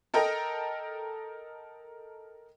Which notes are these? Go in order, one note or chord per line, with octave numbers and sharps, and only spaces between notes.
A4 A#4 D#5 G5 A#5